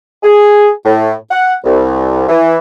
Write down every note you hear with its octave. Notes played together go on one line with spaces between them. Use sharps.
G#4
A2
F#5
C2
E3